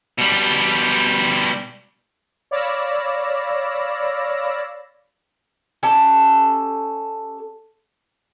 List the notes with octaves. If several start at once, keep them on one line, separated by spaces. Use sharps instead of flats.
B2 G3
C#5 D5 F5 B5 E6 A#6
C#4 G4 A4 A5